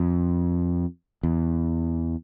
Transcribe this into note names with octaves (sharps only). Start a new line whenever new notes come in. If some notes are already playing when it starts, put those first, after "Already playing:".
Already playing: F2
E2